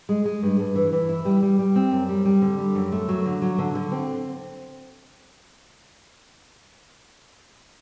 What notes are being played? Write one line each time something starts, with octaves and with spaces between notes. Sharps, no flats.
G#3
G#3
G2
G2
E3
E3
E4
G3
G3
G3
C4
F#2
G3
G3
D3
G3
F#2
A3
F#3
D3
F#3
D3
D3
C4